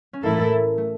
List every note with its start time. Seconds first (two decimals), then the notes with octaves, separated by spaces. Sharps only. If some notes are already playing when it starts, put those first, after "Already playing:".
0.13 C#4
0.23 A2 E3 A3 A#3 E4 A4
0.78 A3